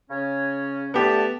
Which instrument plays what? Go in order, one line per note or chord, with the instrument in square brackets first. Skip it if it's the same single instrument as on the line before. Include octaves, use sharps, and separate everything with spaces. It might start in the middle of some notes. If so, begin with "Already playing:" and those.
[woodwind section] C#3 C#4
[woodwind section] D3 A3 A5 [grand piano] B3 G4